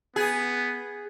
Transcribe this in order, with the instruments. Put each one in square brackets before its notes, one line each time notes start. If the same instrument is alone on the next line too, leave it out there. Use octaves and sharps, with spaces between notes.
[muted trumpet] B3 [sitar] G#4